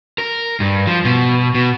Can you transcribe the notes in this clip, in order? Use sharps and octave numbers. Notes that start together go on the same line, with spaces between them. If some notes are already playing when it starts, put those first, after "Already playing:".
A#4
G2
F3
B2
B2